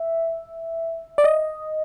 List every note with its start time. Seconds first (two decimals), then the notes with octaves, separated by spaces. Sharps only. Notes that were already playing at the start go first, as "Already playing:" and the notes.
Already playing: E5
1.18 D5
1.24 D#5